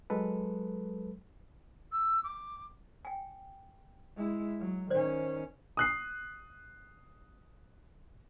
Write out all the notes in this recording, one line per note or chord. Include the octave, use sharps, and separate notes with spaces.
F#3 G#3 A4 B4
E6
D6
G5 G#5
G#3 E4
F#3
D#3 C#4 C5 D5
D#6 F#6 C7